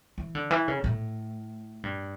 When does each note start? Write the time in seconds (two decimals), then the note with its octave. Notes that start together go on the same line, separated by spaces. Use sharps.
0.18 E3
0.35 D3
0.51 E3
0.68 C#3
0.84 A2
1.83 G2